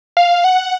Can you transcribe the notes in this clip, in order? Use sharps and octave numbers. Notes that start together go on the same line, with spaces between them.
F5
F#5